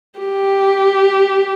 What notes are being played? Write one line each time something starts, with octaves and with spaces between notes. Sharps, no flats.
G4